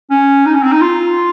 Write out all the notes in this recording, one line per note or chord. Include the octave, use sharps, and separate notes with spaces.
C#4
D#4
C#4
C4
D#4
F4